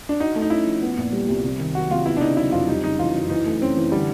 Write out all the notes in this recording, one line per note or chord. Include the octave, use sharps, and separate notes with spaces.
D4
D#4 F#4
A3
D#4
C#4 E4
F3
B3
A#2
G3
C2
C3
D#3
F#3 F#4
C3 F4
B3 E4
D4
C#3 D#4
F#3 E4
F2 F4
G3 D#4
C#3 D#4
E3 F4
F#2
E3 D#4
A3
C4 C#4
E3
D3 G3